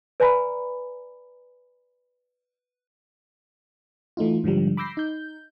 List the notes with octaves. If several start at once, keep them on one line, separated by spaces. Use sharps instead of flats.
B4 D5 G#5 A#5 B5
E3 A3 D#4 F4
G#2 D3 F3 G3
B5 D6 E6 G6 A#6 C7
D#4 G6